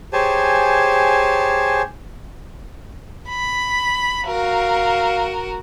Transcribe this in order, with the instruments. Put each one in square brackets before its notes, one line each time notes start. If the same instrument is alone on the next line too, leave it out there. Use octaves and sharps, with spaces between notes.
[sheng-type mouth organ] G4 G#4 C5 C#5 G#5 A5
[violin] B5
[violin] F#4 A#4 [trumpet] F5